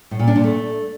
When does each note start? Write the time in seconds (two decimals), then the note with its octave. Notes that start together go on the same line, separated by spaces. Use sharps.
0.11 A2
0.19 A#2
0.28 D4
0.36 A#2
0.44 A3